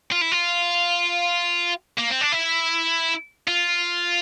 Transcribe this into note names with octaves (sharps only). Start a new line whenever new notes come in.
F4
E4
F4
A#3
C4
D4
E4
F4